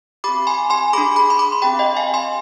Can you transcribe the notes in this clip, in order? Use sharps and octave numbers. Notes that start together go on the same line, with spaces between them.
C4 G4 B5 D6
G#5 C6
G#5 C6
D4 G#4 B5 D6
B5 D6
C6
B5 D6
C6
C4 G4 G5 B5
D#5 G5
F5 G#5
G#5 C6